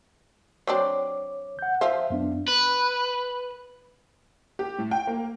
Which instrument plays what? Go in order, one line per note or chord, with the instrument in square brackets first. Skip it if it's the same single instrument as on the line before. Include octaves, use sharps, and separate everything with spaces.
[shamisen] F#3 C4 D4 [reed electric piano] C#5 D6
[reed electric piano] F#5 G6
[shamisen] F3 C5 [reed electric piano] E5
[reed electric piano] F#2 B3 D4
[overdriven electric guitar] B4
[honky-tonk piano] G4
A2
G5
A#3